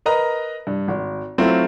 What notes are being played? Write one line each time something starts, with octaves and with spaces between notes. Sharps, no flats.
A#4 B4 D#5 A#5
G2
G#1
F#3 A3 C4 E4 F4